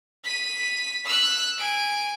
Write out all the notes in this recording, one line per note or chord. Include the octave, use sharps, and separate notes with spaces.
B6 D#7
E6 F#6
G#5 D7